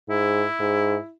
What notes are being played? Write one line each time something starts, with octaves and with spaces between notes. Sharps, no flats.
G#2 E4
G#2